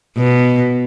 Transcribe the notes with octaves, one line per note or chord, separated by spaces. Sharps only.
B2